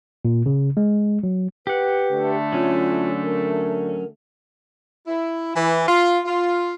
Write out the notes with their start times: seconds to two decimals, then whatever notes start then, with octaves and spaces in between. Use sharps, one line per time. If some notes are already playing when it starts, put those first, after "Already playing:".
0.25 A#2
0.46 C#3
0.77 G#3
1.23 F#3
1.67 G4 B4 F#5
2.11 D3 A3
2.52 F#3 C#4 F4
3.23 A#4
5.07 E4
5.55 E3
5.87 F4
6.25 F4